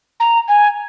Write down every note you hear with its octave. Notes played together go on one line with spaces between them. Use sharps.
A#5
G#5